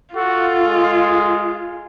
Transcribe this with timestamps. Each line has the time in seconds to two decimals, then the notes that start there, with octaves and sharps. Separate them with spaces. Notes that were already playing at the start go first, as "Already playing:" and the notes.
0.15 F4 F#4 A4
0.63 G#3